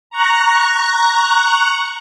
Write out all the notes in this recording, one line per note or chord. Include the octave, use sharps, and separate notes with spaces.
A#5 C#6 F#6